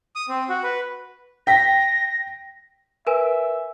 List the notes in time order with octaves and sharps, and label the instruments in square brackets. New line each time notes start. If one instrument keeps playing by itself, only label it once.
[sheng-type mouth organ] D#6
C4
F#4
B4
[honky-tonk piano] G5 B6 [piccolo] A#6
[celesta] A#4 B4 G#5 [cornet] E5